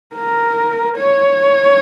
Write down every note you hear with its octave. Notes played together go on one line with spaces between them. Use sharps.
A#4
C#5